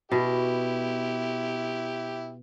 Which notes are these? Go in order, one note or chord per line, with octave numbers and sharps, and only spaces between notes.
B2 E4 G4